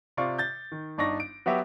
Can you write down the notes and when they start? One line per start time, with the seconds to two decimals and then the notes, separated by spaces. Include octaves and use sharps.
0.17 C3 F4 D5 C#6
0.38 G6 A6
0.72 D#3
0.98 G1 D4 D#4 C#6 A#6
1.20 D7
1.46 F#3 B3 F#4 G4 E5